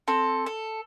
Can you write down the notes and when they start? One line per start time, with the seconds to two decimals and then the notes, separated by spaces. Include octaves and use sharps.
0.08 C4 A4
0.46 A4